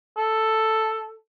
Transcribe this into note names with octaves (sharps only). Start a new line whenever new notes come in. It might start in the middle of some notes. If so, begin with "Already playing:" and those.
A4